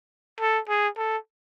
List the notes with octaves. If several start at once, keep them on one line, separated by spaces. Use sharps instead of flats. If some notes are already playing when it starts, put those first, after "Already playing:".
A4
G#4
A4